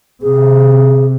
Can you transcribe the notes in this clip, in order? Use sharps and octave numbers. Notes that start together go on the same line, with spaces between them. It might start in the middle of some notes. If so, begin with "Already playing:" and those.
C3 G#4